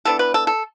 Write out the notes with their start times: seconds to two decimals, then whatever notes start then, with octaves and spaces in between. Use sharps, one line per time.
0.05 E3 B3 D4 A4
0.19 B4
0.34 A4
0.47 A4